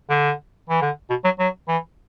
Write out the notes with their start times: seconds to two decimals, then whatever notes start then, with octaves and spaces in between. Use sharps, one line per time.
0.10 D3
0.69 E3
0.82 D3
1.10 B2
1.24 F#3
1.39 F#3
1.68 E3